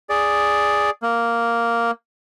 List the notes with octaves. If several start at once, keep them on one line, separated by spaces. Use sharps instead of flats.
G#4 D5
A#3